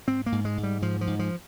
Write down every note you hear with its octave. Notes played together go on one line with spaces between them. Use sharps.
G#2 C4
A#3
G#2
G#3
G#2
G3
G#2 F3
F3
G#2
F3